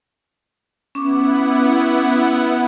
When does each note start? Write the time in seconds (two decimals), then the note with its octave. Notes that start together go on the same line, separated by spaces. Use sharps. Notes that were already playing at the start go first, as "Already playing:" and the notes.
0.95 B3 C#4 E4 F#5 C#6 D6